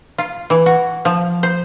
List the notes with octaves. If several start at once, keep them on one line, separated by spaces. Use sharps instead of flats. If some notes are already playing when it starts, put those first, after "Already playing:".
F4
E3
F#4
F3
C5